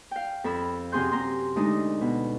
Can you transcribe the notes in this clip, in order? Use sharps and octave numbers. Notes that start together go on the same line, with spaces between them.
F5 G5
F2 A4 B5 E6
F#2 C3 C4 G#4 C6 G6
C4 A#5 C6
D2 G#3 D4 D#4 D#5
B2